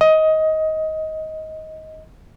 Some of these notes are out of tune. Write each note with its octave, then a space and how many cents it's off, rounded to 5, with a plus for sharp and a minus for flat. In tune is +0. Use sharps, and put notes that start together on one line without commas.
D#5 +15